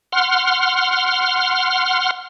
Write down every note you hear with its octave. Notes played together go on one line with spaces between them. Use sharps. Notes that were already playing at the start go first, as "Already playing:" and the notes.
F#5 C6 F6